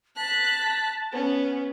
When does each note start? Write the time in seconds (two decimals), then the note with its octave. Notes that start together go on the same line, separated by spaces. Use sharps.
0.16 A5 F#6 B6
1.12 B3 C#4